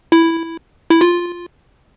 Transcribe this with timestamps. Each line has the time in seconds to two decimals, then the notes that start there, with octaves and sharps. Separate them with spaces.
0.12 E4
0.91 E4
1.01 F4